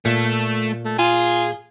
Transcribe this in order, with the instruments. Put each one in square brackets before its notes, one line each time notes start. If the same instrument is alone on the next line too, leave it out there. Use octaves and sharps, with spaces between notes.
[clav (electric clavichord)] A#2 [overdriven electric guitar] A3
[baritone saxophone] A3
[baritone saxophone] F4 [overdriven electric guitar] G#4